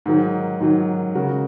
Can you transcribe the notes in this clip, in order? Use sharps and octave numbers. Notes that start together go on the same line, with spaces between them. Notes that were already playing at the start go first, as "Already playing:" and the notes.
G#2 D#3 F#3
G#2 D#3 F#3
C#3 G#3 F#4 A#4